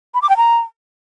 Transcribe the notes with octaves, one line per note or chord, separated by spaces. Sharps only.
B5
D6
G5
A#5